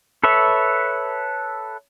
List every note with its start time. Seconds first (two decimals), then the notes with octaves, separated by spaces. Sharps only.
0.24 A4 B4 C#5 E5